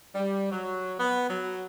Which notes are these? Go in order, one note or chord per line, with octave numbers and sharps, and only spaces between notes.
G3
F#3
B3
F#3